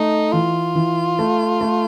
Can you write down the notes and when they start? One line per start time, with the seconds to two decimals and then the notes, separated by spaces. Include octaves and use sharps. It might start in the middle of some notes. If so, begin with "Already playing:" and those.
Already playing: A3 D#4
0.32 E3 F4
0.75 E3
1.19 A3
1.61 A3